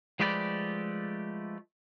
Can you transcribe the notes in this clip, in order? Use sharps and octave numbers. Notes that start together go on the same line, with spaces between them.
F3 G#3 A3 G4 B4 D5